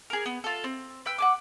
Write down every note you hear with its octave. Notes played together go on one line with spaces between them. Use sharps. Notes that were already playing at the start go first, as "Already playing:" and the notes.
G#4 A#4
B3
F4 A4
C4
B4 G5 E6
F#5 G#5 D6